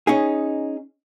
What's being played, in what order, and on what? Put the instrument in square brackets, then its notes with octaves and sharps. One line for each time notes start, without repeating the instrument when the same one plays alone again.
[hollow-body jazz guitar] C#4 D#4 G#4